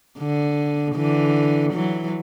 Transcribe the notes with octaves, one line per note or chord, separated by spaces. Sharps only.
D3
D3 E3
E3 F#3